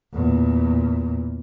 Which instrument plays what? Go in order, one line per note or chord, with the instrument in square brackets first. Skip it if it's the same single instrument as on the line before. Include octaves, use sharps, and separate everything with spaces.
[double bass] E2 A#2